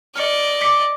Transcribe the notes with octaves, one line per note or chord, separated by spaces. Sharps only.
D5 D#5 F6 C#7
D6 B6 C#7